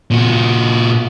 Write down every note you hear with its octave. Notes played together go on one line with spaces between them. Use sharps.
A#2 F#4